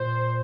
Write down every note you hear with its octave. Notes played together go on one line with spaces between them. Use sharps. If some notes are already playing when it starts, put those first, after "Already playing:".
Already playing: A#2 C5